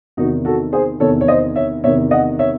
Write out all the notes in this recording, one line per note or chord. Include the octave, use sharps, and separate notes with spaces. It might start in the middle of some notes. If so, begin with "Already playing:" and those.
E2 C3 D#3 D#4 F#4
F#4 A4
G#4 C5
E2 C3 D#3 A4 C#5
C#5
C5 D#5
C#5 E5
E2 C3 D#3 C#5 E5
D#5 F#5
C#5 E5